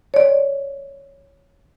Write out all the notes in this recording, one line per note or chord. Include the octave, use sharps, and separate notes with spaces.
C#5 D5